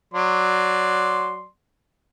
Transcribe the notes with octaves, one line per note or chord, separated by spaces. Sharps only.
F#3 D5 C6